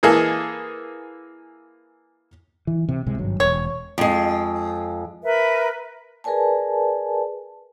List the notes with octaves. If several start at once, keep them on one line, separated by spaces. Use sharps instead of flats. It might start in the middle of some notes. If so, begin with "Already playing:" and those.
E3 A#3 G#4 A4 D#5
E3
C3
C2 C3 G#3
G#1 G2 F#3
E1 C#5
F2 G#3
A#4 B4 E5 B5
G#4 A#4 B4 D5 G#5 A5